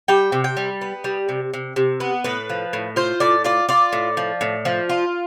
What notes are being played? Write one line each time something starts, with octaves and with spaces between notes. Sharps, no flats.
G3 G5
C3
G5
G3
B3
G3
C3
C3
C3
B3
A2 B4
F3
A2
F4 C5
A2 D5
F4 D5
F4 D5
A2
F3
A2
F3
F4